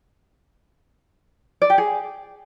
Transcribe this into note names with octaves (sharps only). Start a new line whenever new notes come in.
D5
G4
G#4